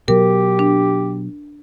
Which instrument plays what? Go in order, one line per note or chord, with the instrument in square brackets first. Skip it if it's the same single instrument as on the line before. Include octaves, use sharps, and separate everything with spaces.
[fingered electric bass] B2 F#3 [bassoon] G4 [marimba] A#4
[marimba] D4